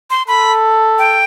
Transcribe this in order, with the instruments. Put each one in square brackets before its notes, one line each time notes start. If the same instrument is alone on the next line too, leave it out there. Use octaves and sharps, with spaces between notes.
[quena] C6
[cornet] A4 [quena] B5
[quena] G5